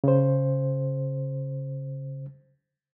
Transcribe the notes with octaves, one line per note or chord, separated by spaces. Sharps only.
C#3 C5